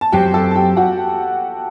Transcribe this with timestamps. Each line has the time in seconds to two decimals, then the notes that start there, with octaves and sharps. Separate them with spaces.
0.01 A5
0.12 F#2 F#3 C4 F#4 G4 C5 G5
0.34 A4 A5
0.51 A5
0.55 G4 G5
0.77 F#4 F#5